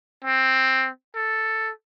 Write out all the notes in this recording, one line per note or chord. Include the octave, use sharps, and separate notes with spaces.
C4
A4